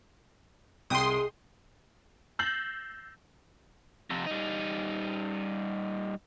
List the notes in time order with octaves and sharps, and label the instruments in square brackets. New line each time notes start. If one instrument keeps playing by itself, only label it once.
[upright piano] C2 G5 [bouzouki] G#3 D#4 G#4 [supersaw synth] C6 D#6
[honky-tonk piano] E6 G6 A6 A#6 C7 F#7
[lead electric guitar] F2 C3
G3 D#4